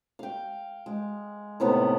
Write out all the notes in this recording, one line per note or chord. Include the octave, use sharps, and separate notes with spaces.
F5 G5
G#3
A2 C3 B3 D#4